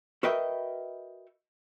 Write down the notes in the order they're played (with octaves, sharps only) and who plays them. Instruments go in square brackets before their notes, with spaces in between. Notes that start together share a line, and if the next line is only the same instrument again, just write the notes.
[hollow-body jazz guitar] F#4 A#4 B4 D#5 E5 G5